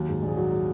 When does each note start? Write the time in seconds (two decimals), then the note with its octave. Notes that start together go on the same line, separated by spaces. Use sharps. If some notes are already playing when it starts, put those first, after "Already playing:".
Already playing: D#2 F#3
0.09 G#2
0.22 A#1
0.29 G#4
0.37 F#3 F#4
0.52 F#3